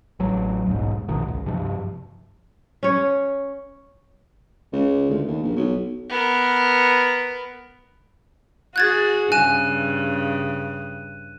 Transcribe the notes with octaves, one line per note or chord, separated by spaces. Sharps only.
A1 F#3
D#1 B1 G#2
A#1 G2 B2 D#3
C#2
G2 C3 F3
C#4 C#5
C#2
D2
D#2
A#1
B1
B3 A#4
F#4 G#4 F#6 G#6 A6
G2 C#3 G#5 F#6 D#7 E7